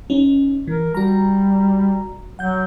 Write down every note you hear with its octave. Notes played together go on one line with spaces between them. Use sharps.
C#4 D#4
E3 A#4
G3 F#4 A#5
F#3 F#5 G6